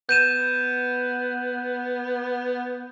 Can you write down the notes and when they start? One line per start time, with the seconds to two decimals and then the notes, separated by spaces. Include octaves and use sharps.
0.09 B3 G6 D#7 E7